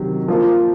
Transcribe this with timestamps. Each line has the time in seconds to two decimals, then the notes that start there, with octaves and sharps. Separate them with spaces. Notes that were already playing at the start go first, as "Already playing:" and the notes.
Already playing: C3 D#3 F#3
0.28 F3 A#3 F4